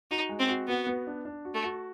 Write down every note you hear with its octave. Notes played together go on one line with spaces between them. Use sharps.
D#4 F#4
G#3
C4
F#4
B3 F#4
B3
D4
D4
F#4
A3
F#4